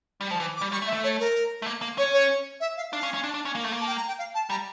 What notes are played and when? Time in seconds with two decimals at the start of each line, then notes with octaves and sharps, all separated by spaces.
0.21 G3
0.31 F3
0.40 E3 D6
0.56 D6
0.61 G3
0.72 G3 C#6
0.82 A3
0.87 E5
0.93 A3
1.04 C#5
1.20 A#4
1.62 A3
1.66 A#3
1.82 A#3
1.98 C#4 C#5
2.13 C#5
2.60 E5
2.77 F5
2.92 D4 F5
3.03 C#4
3.14 C#4
3.24 D4
3.34 D4
3.45 C#4
3.55 A#3
3.64 A3
3.72 A#3
3.81 A5
3.87 G5
3.97 A#5
4.08 G5
4.18 F5
4.34 A5
4.50 G3 A#5